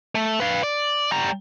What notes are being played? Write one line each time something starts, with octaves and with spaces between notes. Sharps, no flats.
A3
B4 F5
D5
G3 A#5